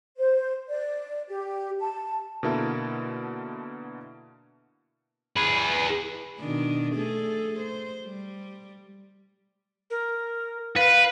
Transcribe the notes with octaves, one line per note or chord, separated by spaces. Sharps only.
C5
D5
G4
A5
B2 D3 A#3 E4 A4
G#4 B4
B2 D#3 D4
A3 G#4 A4
C5
G3
A#4
B4 F5